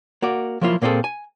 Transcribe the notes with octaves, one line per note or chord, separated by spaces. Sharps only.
A#3 F#4 D5
F3 F#3 A#3 E4 F4
A#2 A#3 C4 G#4 A4
G#5